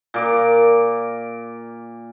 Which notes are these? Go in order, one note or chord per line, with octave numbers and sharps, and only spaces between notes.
A#2 D6